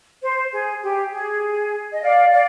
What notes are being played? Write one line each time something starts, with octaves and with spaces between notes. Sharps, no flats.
C5
G#4
G4
G#4
D#5
D5 F5
D5 F5